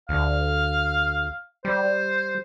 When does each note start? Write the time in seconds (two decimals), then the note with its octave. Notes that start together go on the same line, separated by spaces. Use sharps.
0.09 D2 F5
1.65 G3 C5